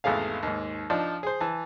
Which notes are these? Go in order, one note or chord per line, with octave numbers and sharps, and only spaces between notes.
G#1 E2 A3 G#4 F5
D#2 G#2
F3 D4 D#4
G#4 C5
E3 A5